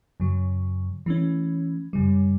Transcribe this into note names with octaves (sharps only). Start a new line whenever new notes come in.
F#2 C#3 F#3
E3 A3 C#4
F#2 C#3 G3